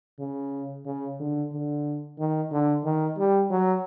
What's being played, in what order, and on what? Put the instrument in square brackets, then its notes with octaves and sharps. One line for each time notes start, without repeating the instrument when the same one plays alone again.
[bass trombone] C#3
C#3
D3
D3
D#3
D3
D#3
G3
F#3